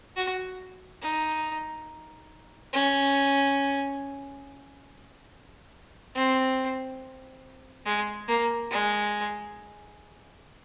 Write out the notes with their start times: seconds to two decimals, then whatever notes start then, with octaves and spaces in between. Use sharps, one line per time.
0.16 F#4
1.02 D#4
2.73 C#4
6.15 C4
7.86 G#3
8.28 A#3
8.71 G#3